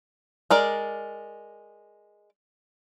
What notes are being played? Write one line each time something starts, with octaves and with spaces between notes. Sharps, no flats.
G#3 A#4 D5